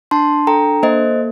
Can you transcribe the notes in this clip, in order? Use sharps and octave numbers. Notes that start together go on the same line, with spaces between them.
D4 A5 C6
A4 G5 A#5
A#3 C5 D#5